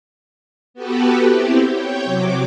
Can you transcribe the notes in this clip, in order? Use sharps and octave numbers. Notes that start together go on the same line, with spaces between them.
B3 F#4 G4 A4 B4
C4 E4 G4
C#5 G5
C3 F#3 D6